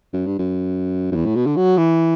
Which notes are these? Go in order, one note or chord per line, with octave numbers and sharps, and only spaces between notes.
F#2
G2
F#2
F#2
E2
A2
B2
D3
F#3
E3